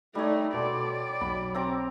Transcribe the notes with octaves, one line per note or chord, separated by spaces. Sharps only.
G3 A3 D#4 C#5
B2 A4 D5 C6
B1 B5
C4 A#5 D6